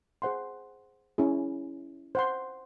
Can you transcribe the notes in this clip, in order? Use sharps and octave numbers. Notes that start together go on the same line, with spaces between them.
G#4 C5 F#5 C6
C#4 E4 G#4
C5 F#5 C6